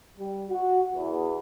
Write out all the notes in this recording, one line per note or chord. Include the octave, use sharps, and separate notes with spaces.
G3
F#4
E2